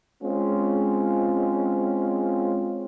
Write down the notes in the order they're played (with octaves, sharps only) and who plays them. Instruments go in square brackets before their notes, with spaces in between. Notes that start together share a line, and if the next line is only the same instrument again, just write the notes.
[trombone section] G#3 C4 C#4 F4